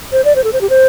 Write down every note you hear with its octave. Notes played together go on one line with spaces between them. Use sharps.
C5
D5
C5
A4
C5
G4
C5